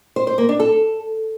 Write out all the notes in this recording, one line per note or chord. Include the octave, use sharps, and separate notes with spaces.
C5
C5
A#3
D4
A4